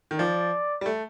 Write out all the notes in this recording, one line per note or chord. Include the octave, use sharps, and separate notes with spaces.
D#3
F3 D5
G3
A3